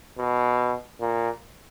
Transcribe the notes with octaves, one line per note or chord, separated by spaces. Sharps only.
B2
A#2